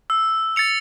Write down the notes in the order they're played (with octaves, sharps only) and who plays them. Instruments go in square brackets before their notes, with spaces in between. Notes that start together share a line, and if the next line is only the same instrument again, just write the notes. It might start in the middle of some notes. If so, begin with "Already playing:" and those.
[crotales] E6
A6 C#7 F7